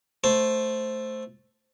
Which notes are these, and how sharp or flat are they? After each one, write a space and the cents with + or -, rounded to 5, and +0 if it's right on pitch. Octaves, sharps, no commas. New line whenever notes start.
A3 +0 C5 +0